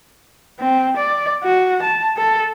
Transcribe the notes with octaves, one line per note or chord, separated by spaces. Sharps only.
C4
D5
F#4
A5
A4